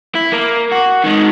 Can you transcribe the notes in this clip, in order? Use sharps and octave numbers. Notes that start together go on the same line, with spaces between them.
E4
A#3
F#4
D#3 G#3